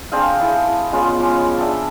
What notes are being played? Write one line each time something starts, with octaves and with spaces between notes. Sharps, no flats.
C4 D4 G#4 F5
E4 G#4 A5
G#3 B3 C#4 F4
F3 C#4 D6
D4 E5 G5 A5